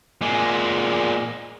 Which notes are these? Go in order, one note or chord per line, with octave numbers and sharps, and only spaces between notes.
A#2 G#3